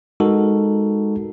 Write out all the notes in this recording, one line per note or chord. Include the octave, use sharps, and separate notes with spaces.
G#3 D#4 F#4 A4 A#4